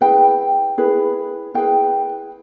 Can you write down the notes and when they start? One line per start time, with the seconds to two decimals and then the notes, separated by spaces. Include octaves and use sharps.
0.01 E4 G#4 B4 G5
0.78 E4 G#4 B4
1.54 E4 G#4 B4 G5